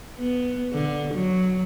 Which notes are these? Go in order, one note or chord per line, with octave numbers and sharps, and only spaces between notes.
B3
D3
F#3